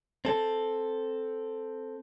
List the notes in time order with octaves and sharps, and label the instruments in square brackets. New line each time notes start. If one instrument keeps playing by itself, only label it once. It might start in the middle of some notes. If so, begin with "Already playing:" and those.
[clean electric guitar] C4 A4